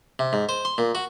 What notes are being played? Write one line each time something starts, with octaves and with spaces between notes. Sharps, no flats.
C3
G#2
C5
C6
A#2
F#4